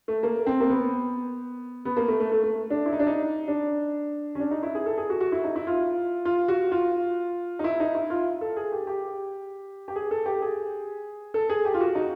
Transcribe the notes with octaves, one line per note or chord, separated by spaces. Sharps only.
A3
A#3
C4
A#3
B3
B3
A#3
A3
A3
A3
A3
D4
E4
D#4
D4
D#4
D4
C#4
D4
D#4
E4
G#4
A4
G#4
F#4
F#4
E4
D#4
E4
F4
F4
F#4
F4
D#4
E4
D#4
E4
F4
A4
G#4
G4
G4
G4
G#4
A4
G4
G#4
A4
G#4
G4
F4
F#4
D#4